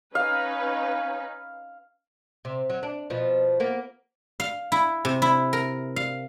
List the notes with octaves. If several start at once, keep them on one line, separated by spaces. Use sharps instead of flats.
C#4 D#4 B4 F5
C3
F#3
D4
B2 F3
A#3 B3
F5
E4
C3
E4
A#4
F5